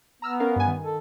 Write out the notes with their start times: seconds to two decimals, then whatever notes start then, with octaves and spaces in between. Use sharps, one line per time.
0.22 B3 A#5 E6 F6
0.40 C#4 A#4 F5
0.56 G2 G#5
0.67 D#3
0.84 A4